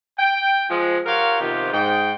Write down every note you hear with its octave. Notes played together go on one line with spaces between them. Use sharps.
G5
F3 G#3
F4 G4 A#4 C#5 F5 F#5
C3 D#3 F3 B3 F4 G4
G#2 G5